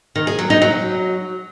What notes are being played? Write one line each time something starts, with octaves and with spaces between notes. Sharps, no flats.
D#3
G#4
F#3
D#4
F#3